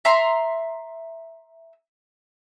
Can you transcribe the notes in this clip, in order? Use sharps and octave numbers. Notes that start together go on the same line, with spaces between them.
E5 A#5 C6